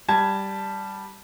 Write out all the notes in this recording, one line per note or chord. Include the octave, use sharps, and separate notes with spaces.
G3 A5 G#6